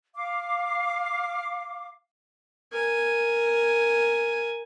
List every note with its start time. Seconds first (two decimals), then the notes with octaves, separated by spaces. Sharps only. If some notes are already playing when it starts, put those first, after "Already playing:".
0.15 F5 D6
2.73 A#4 G#5